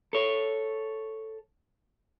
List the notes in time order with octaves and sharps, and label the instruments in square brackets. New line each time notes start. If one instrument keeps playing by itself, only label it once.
[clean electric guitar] A4 C#5